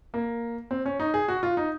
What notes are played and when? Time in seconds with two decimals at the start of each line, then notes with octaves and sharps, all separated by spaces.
0.14 A#3
0.71 C4
0.86 C#4
1.00 D#4
1.14 G#4
1.28 F#4
1.43 F4
1.57 D#4